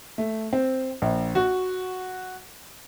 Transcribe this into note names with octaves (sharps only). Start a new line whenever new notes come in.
A3
C4
A#1
F#4